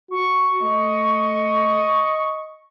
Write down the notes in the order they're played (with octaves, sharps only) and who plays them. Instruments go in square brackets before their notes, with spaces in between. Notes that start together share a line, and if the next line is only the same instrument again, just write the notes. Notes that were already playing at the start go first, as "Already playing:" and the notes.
[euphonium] F#4 [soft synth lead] C#6
[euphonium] A3 [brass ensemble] D#5